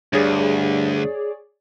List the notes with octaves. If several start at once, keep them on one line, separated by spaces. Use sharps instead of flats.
D2 G2 G#4 C#5 D5